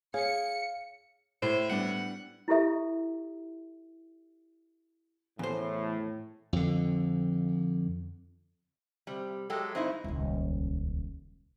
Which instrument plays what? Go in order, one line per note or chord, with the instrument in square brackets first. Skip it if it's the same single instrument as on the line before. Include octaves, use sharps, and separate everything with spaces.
[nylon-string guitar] G#4 [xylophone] C#5 [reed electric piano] F5 [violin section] C#7
[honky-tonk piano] A2 [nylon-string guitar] E4 [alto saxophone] C5
[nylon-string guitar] G3 B3 D4 [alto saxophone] F#5
[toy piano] E4 F4 G4 A4 E5
[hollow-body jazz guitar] E2 C5 [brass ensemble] A2
[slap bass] F2 D3
[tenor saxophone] C3 [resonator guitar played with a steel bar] G3
[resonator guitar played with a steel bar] F#3 G#3 G4 [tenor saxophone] A4
[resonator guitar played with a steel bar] G2 D#4 E4 [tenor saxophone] C4
[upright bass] D#1 C#2